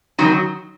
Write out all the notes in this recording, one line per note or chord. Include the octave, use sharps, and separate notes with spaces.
D#3 F#3 D#4 F#4